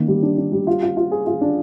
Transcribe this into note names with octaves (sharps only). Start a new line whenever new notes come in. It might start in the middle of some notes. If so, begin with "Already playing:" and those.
Already playing: D#3 A#3
G3
D4
D4
G3
F4
F4
F4
G#4
F4
D4